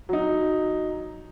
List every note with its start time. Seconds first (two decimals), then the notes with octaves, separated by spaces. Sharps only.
0.09 F#3 D#4